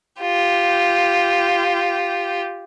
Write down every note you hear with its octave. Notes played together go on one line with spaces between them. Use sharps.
F4 G4